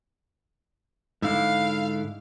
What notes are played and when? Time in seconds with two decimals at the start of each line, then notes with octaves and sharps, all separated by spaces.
1.22 G#2 D3 E4 F5